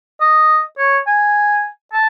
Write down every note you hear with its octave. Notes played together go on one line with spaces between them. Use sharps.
D#5
C#5
G#5
A5